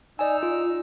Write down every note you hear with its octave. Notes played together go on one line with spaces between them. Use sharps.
D#4 D5 G#5 E6
F4